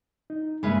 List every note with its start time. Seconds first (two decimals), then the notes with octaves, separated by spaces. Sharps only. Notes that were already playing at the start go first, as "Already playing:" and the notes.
0.30 D#4
0.63 G2 C#3 G#3 A#3 B4 E5